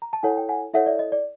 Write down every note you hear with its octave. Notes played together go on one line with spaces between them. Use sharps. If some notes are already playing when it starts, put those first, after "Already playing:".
A#5
A5
E4 A4 C#5 F#5 G#5
G5
F#5 G#5
E4 A4 C#5 E5 F#5
D5 E5
D#5
D5